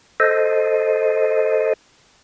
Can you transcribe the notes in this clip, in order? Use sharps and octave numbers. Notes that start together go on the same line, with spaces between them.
A4 C5 D#5